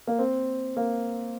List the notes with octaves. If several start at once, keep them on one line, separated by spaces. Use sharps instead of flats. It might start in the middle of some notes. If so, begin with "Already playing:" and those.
A#3
C4
A#3